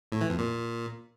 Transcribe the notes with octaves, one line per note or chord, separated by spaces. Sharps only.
A2
E3
F2
A#2